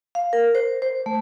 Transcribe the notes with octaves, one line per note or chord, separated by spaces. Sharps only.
F5
A#4
C5
C5
A3